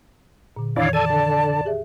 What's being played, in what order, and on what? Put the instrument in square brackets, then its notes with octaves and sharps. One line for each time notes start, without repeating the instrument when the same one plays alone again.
[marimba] A#2 D3
[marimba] F2 D#3 E3 [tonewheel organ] D4 E4 D5 [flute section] C#5 F5
[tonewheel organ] A4 G#5 [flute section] D5 A5
[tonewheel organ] D3
[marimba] G4 G#4 E5